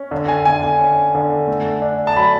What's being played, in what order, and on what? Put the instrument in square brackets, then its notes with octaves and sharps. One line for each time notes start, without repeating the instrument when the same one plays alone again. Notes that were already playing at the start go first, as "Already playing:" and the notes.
Already playing: [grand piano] C#4
D3
G#5
D3 G#5
G#5
C#4
D3
A3
D4
A5
F#3 B5